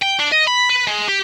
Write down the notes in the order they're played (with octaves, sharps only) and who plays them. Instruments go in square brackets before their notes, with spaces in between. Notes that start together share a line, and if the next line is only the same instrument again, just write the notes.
[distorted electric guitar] G5
D4
D#5
B5
B4
G#3
G4